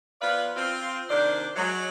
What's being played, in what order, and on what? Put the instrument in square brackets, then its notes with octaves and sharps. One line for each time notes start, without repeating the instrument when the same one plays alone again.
[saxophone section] F3 B3 F4 B4 D5 F5
C4 F4
C3 D#3 D4 C5 D5
F#3 G#3